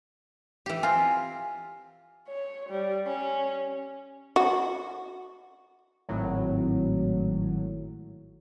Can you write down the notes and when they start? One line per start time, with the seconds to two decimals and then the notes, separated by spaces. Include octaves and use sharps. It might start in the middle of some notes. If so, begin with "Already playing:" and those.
0.66 E3 G4
0.83 C4 F4 G#5
2.29 C#5
2.69 G3
3.06 C#4
4.36 F#4
6.09 G#1 A2 F#3